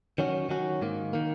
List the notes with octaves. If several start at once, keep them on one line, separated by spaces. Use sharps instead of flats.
D#3 F#3 C#4 F#4
D#3 F#3 C#4 F#4
G#2 D#3 A#3
D#3 A#3